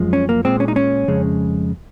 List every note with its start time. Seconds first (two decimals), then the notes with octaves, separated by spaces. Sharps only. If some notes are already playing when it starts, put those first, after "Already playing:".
Already playing: F#2 F3 G#3
0.13 C#4
0.29 A#3
0.45 A#2 G#3 C4
0.60 C#4
0.68 D#4
0.76 C#4
1.08 F2 C#3 G#3